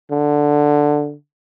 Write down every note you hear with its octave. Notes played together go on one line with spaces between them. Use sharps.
D3